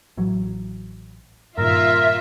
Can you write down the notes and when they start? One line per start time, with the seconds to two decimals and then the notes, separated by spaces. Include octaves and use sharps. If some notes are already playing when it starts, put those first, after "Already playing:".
0.17 A1 E3 F#3
1.58 G2 A#2 D#3 F4 A#4 E5